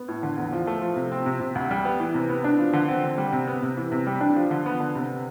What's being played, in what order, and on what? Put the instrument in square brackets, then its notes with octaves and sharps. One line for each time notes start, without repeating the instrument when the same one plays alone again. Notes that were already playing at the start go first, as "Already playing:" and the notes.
Already playing: [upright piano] B3
A2
D3
E2
F3
A3
F3
C3
C4
C3
C3
D2
G3
B3
E3
C3
B3
D4
F3
D3
C4
D3
G3
C3
B3
C3
E3
C3
G3
D4
F3
D3
B3
D3
C3